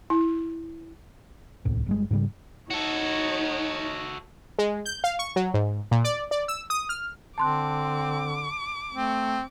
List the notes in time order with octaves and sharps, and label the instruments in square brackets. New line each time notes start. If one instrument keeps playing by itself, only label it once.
[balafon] E4
[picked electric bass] D1 C2 A2
G1 G3 G#3
G#2 C#3 F#3 G3
[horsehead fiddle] D#4 C#5 [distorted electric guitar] F#4 A4
[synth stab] G#3
G6
F5
C#6
F#3
G#2
A#2
D5
D5
E6
D#6
F6
[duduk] D3 [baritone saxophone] C4 [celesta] A5 C6 F#6 [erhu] D6
[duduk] A3 [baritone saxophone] C4